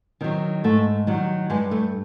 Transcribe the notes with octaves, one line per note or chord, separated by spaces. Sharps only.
D#3 F#3 C4
G#2 A3
D#3 F#3 G3
G2 G#3
A3